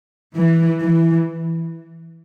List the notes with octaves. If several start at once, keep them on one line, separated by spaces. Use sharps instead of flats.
E3
E3